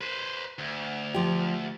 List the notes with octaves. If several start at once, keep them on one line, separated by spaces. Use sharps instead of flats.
B4 C5
D2
F3 G4